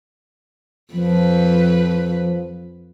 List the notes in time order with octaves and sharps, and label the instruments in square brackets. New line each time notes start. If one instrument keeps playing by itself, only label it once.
[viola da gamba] F2 B4 [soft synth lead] F3